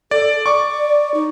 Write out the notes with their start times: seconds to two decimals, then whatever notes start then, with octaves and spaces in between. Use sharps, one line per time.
0.11 A4 D5
0.46 D5 C#6 D6
1.14 D#4